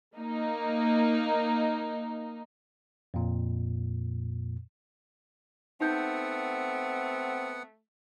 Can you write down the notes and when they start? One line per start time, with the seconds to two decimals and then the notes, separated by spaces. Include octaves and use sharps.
0.16 A#3 D#4
3.14 F2 A#2
5.81 A3 B3 C4 D#4 F#5 G6